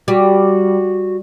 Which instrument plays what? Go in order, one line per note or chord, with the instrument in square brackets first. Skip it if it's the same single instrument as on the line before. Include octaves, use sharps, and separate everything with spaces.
[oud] G3 [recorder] F#4